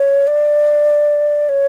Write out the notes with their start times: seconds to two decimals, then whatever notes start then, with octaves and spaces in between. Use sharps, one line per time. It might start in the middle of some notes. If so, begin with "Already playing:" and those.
Already playing: C#5
0.27 D5
1.49 C#5